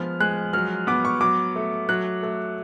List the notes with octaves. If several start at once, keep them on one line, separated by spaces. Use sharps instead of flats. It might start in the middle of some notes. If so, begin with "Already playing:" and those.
Already playing: F3 G#3 B3 F6
G#3 F#6
F#3 F6
B3 D6
C#6
F#3 D6
A3
F#3 F#6
A3